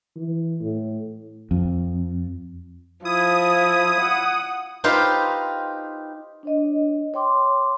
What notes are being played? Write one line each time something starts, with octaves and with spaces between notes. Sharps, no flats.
E3
A2
F2
F3 E4 D#6
F#5
D#4 F4 G4 B4 C5 F5
D4 C#5 D#5
C#5 G5 C6 D6